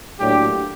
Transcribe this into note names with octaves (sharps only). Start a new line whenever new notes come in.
A2 F#3 A#3 D4 G4